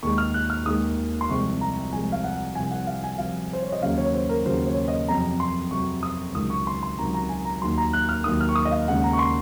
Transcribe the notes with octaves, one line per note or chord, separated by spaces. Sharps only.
D#2 D#3 G#3 C#6
F6
F#6
F6
D#2 D#3 G#3 D#6
C6
C2 C3 F3 G#3 C#6
A#5
C2 C3 F3 G#3 G#5
F5
F#5
C2 C3 F3 G#5
F#5
F5
G#5
C2 C3 F3 F5
C5
C#5
D#5
D#2 C#3 F#3 F5
C#5
C5
A#4
D#2 C#3 F#3 C5
C#5
D#5
F2 C3 F#3 A#5
C6
F2 C3 F#3 C#6
D#6
C#2 C3 D#3 F#3 D#6
C#6
C6
C6
C#2 C3 D#3 F#3 A#5
A#5
G#5
A#5
D#2 D#3 F#3 C6
A#5
F#6
F6
D#2 D#3 F#3 D#6
F6
C#6
D#6
D#5
F5
D#2 C#3 G#3 F#5
A#5
C#6
C6